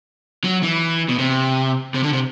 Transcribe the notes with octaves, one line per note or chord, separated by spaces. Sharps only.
F#3
E3
B2
C3
C3
D3
C3